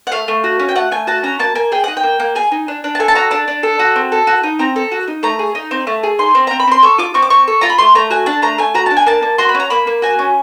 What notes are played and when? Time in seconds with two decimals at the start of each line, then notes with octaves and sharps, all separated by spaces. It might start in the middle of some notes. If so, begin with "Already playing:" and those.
0.07 F#5
0.12 A3 F5
0.28 A3
0.44 F#4
0.59 C#4
0.69 G5
0.76 A3 F#5
0.91 A3 G#5
1.07 F#4 A5
1.23 C#4 A#5
1.39 A#3 A5
1.55 A#3 G#5
1.72 G#4 G5
1.84 D#4 F#5
1.97 G5
2.03 A#3
2.20 A#3
2.35 G#4 G#5
2.52 D#4
2.68 D4
2.84 D4
2.95 A5
3.00 A4 G#5
3.08 A5
3.15 F#4 A#5
3.31 D4 A5
3.48 D4
3.63 A4
3.79 F#4
3.96 C4
4.12 A4
4.27 F#4
4.43 D#4
4.59 C4 A#5
4.76 A4
4.92 F#4
5.08 D#4
5.23 A3 A#5
5.39 G#4
5.55 D#4
5.71 C4
5.87 A3
6.03 G#4
6.19 D#4 C6
6.35 C4
6.47 C4 A#5
6.60 B5
6.67 C4 C6
6.83 A4 C#6
6.98 F4 D6
7.14 C4 C#6
7.22 D6
7.30 C4 C#6
7.47 A4
7.61 F4 A#5
7.69 B5
7.78 A3 C6
7.95 A3 A#5
8.10 F#4 G#5
8.26 D4 A5
8.42 A3 A#5
8.58 A3 G#5
8.74 F#4 A#5
8.86 D4 A5
8.97 G#5
9.06 A#3 A5
9.22 A#3
9.38 F#4 C6
9.49 B5
9.54 C#4
9.60 A#5
9.70 A#3 B5
9.87 A#3
10.02 F#4 G#5
10.19 C#4